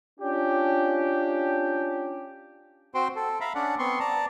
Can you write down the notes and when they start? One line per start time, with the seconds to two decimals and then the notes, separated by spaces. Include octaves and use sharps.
0.20 C#4 D4 F4 G4
2.95 C4 F#4 C5 G5 C6
3.16 A4
3.41 E5 F5 A#5 B5
3.55 C#4 D4 D5 F#5
3.79 B3 C4 C6 C#6
4.00 D5 A5 A#5